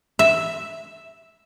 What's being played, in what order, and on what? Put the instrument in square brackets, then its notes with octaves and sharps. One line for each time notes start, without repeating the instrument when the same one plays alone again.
[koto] E5